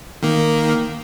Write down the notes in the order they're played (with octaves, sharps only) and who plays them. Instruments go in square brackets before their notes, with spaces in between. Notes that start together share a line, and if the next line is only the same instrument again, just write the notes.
[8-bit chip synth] D#3 A#3